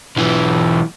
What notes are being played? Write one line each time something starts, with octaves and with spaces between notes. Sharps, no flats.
B1 E3